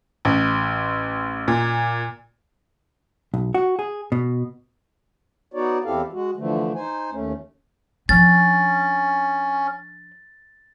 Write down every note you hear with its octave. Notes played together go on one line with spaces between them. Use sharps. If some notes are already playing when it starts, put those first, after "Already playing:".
A1
A#2
B1
F#4
G#4
B2
B3 D#4 F#4 C#5 D5
E2 C4 E4 G4 A4 F5
G#3 F#4
D3 E3 F3 A3
D#4 C5 G#5
D#2 A3 C#4
F3 C#4 D4 A6